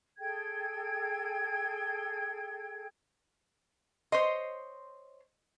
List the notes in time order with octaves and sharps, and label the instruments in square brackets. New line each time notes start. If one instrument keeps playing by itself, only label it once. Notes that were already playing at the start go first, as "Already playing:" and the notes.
[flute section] G#4 A4 G5 G#6
[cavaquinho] C5 C#5 C6 [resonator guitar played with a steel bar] D#5